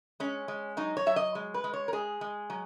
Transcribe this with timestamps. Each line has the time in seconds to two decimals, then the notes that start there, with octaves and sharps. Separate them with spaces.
0.20 G#3 C#4
0.48 G#3
0.77 F#3 D#4
0.97 C#5
1.06 F#3 E5
1.16 D#5
1.35 G#3
1.54 B4
1.64 G#3
1.74 C#5
1.88 A#4
1.93 G#3 G#4
2.21 G#3
2.50 F#3